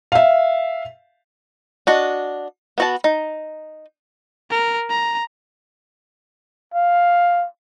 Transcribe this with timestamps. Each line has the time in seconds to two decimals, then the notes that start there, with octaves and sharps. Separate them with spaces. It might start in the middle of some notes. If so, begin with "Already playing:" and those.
0.12 E5 F5
1.87 D4 F#4 D#5
2.78 B3 F#4 A5
3.04 D#4
4.51 A#4
4.90 A#5
6.74 F5